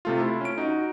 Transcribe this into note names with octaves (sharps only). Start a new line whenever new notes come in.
C3 A3 F4
E4
C#4 D7
D#4 F#4